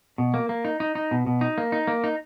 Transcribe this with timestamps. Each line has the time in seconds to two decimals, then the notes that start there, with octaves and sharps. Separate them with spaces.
0.18 B2
0.34 A#3
0.49 A#3
0.65 D#4
0.80 D#4
0.95 D#4
1.11 B2
1.26 B2
1.41 D#4
1.58 A#3
1.72 D#4
1.87 A#3
2.04 D#4